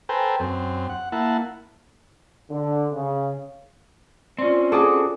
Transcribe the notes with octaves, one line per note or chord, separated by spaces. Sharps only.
A4 B4 C5 G5 G#5 A#5
F#2 C4
F#5
A#3 E4 F#5 A5
D3
C#3
C4 C#4 F4 D5
F#4 G#4 A4 A5 D6 D#6